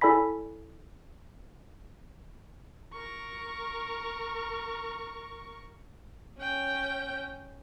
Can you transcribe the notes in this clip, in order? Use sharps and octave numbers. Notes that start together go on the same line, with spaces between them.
E4 A4 D5 G#5 B5 B6
A#4 C#6
C#4 G5